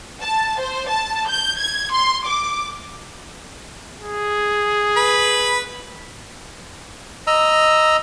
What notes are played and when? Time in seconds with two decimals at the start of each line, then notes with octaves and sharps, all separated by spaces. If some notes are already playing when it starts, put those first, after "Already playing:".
0.21 A5
0.59 C5
0.89 A5
1.29 G6
1.59 G#6
1.92 C6
2.27 D6
3.99 G#4
4.96 B4 B5
7.27 D#5 A#5 E6